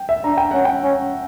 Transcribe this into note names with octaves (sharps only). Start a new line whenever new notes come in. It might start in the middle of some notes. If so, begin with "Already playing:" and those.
Already playing: G5
E5
D4 A#5
G5
C#4 F#5
G5
C#4